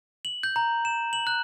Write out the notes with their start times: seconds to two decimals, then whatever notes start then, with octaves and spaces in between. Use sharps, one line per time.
0.25 F#7
0.43 G6
0.56 A#5
0.85 E7
1.13 F#7
1.27 F#6